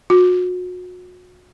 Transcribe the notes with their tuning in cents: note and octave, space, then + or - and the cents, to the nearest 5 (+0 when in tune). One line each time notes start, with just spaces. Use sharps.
F#4 -35